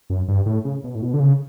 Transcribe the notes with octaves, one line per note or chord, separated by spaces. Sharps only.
F#2
G2
A2
C#3
B2
A2
B2
D3
C#3